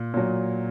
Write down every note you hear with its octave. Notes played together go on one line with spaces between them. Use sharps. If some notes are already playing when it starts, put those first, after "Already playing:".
Already playing: A#2
A#2 F#3